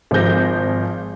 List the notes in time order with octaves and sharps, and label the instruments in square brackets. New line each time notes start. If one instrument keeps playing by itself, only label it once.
[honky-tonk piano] G#1 F3 G#4 G6 A#6